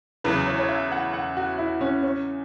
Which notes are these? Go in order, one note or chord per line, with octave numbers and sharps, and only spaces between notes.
E2 C#3 F#3 B4
C#5
C#5
E5
F#5
F#5
F#4
E4
C#4
C#4